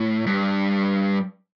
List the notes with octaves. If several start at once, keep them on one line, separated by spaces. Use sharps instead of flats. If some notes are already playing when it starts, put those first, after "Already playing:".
Already playing: A2
G2